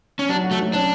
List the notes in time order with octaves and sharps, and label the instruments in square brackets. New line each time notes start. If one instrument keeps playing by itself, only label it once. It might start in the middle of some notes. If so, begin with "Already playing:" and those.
[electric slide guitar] C#4
[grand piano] F#3 [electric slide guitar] D4
[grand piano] F#4
[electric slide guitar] A3
[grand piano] F#3
[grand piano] C#4 [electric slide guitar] D4